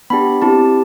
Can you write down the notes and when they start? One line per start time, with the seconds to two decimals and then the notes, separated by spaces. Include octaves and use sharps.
0.10 B3 D4 G4 B5
0.42 C4 E4 G4 A5